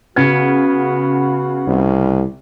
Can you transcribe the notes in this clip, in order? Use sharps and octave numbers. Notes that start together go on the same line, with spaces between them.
C#3 B3 F#4 G#6
C2